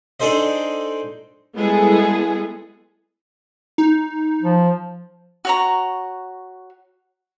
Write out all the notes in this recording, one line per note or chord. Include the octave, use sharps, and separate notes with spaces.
D4 D#4 G#4 A4 C5 D#5
G3 G#3 B3 E4 G#4 A4
D#4
F3
F#4 C#5 A#5